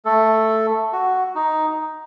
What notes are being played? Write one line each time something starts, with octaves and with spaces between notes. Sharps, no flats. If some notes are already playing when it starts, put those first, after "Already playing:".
A3 A4
F#4
D#4